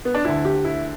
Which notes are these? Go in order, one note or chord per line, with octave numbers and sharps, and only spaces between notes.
B3
D4
D2 D3 E4
G4
E4